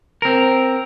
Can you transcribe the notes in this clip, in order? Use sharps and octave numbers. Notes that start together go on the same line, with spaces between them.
C4 A#4